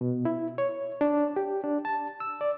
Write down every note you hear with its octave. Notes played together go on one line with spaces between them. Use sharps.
B2
E4
C#5
D4
G4
D4
A5
E6
D5